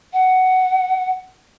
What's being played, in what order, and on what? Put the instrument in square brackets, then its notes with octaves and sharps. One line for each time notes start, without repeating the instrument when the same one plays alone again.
[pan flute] F#5